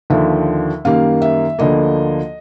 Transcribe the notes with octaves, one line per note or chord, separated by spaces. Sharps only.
D#2 D3 F3 E5
F#2 D#3 G3 A#3 F5
E5
D2 D3 F3 A#3 D#5